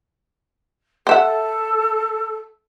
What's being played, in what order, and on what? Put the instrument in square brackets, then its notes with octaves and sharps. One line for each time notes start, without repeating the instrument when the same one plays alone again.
[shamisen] C4 E5 F#5 [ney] A4